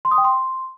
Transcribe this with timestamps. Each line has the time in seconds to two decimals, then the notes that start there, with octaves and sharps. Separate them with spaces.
0.05 C6
0.11 D#6
0.18 G5
0.24 C6